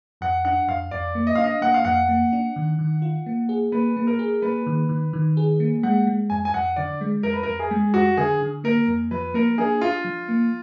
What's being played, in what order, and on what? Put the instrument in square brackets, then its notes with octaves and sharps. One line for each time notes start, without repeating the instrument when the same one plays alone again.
[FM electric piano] F2 [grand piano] F#5
[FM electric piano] D4 [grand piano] F#5
[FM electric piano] F2 [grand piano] F5
[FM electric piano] F2 [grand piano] D5
[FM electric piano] A#3
[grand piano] D#5
[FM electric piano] D4 [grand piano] F5
[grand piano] D#5
[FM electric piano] A#3 [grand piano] F#5
[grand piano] F5
[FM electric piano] F2 [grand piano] F#5
[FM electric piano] A#3
D4
D#3
D#3
F4
A#3
G#4
[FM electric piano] A#3 [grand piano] B4
[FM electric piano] A#3
[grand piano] A#4
[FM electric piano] G#4
[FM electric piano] A#3 [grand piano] B4
[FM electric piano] D#3
D#3
D#3
G#4
A#3
[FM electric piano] G#3 [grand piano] F#5
[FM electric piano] G#3
[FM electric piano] F2 [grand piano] G#5
[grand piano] G#5
[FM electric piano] F2 [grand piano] F#5
[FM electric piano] D3 [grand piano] D5
[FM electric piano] G#3
[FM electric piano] F2 [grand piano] A#4
[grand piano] B4
[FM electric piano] F2 [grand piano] A#4
[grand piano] G#4
[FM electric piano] G#3
[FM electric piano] F2 [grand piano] F#4
[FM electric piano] D3 [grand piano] G#4
[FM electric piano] D3
[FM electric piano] A#3 [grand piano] A#4
[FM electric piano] F2
[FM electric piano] F3 [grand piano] B4
[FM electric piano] A#3 [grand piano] A#4
[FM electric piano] D4 [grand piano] G#4
[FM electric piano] D4 [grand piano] F4
[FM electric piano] F3
A#3